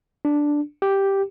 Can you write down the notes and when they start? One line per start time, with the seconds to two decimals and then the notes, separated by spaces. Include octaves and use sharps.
0.25 D4
0.82 G4